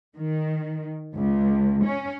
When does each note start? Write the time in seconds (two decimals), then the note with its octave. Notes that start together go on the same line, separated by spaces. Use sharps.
0.16 D#3
1.14 C#2
1.84 C#4